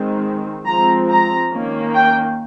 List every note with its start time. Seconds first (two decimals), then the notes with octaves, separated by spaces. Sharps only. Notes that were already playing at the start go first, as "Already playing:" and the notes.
Already playing: D#3 G#3 C4
0.65 F3 G#3 C4 A#5
1.09 A#5
1.51 D#3 A#3 C#4
1.94 G5